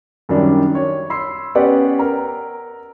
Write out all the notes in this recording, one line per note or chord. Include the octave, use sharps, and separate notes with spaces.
F#2 D#3 F#3 G3 D4
C#5
B5 C6 E6 C7
B3 C#4 G4 B4 D5 F#5
A#4